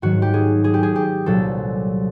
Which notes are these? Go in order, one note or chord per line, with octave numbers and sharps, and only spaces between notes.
G#2 D#3 F#3 F#4
G4
G#4
G#4
G4
G#4
G4
C2 A#2 F#3 A4